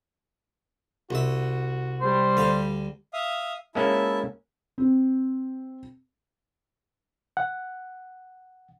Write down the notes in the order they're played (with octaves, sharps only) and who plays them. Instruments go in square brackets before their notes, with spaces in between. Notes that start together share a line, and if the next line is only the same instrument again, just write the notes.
[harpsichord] C2 E5 [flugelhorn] F#4
[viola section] G3 [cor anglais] C5
[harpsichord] D2 F5
[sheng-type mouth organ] E5 F5 D#6
[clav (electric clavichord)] G#3 A#3 C#4 [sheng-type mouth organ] E4 E5 A5
[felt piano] C4
[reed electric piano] F#5